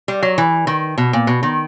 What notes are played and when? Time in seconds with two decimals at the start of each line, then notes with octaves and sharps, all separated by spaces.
0.08 G3
0.22 F#3
0.38 E3
0.67 D#3
0.98 B2
1.13 A#2
1.27 B2
1.43 D#3